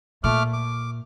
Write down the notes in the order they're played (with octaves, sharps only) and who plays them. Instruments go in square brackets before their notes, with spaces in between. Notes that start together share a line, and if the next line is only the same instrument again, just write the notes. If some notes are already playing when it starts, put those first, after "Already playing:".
[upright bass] A#2 [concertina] A3 D6 F6
[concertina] D6